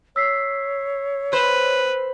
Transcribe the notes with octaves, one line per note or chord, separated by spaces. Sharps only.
C#5 E6 B6 C7
B4 C5